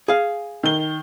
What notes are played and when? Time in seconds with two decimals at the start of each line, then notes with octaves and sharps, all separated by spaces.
0.08 G#4 F5
0.63 D#3 G7